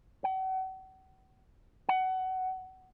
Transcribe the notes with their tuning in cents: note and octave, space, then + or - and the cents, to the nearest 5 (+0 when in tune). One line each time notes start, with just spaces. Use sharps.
F#5 +40
F#5 +20